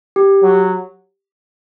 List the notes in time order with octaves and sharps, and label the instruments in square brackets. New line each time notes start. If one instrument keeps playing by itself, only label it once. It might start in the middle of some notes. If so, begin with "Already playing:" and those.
[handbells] G4
[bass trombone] F#3